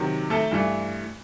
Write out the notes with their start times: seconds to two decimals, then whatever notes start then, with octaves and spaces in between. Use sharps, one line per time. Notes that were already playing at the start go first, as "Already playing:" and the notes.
Already playing: C3 D#3 F#3
0.30 A3 A4
0.51 G2 E3 A3